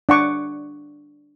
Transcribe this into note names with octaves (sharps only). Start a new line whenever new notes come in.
D4 F#5 C#6 D6